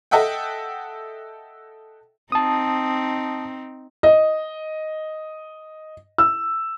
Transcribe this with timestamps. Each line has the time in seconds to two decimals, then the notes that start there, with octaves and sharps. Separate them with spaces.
0.11 A4 D#5 E5 F#5 G5
2.32 C4 D#4 A5 D#6
4.03 D#5
6.18 E6